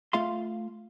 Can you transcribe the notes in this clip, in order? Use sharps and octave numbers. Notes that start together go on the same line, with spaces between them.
A3 F4 F5 C6